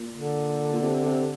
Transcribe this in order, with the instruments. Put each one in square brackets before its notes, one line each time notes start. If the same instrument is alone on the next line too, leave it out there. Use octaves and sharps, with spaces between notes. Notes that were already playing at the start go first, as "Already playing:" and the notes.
Already playing: [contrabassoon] A#2
[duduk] D3
[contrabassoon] A#2
C3
C3